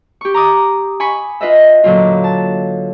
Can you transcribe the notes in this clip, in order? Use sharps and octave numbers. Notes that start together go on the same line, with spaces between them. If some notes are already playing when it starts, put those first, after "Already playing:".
G4 C#6
A#5 D6 D#6
G#5 B5 C#6
F4 B4 D#5 E5
A#2 D3 F#3 F4
A5